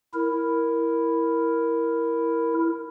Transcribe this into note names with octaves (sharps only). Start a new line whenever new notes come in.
E4 A#4